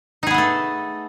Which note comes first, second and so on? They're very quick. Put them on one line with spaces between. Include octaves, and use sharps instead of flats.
D#4 G#4 B3 A3 A4